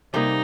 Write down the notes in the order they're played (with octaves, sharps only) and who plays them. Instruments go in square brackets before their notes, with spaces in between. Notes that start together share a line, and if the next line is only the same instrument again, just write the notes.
[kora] C3 G3 A#3 [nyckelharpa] D#4